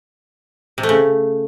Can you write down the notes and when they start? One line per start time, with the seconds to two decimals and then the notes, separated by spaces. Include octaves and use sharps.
0.78 C3
0.83 A3
0.89 C#3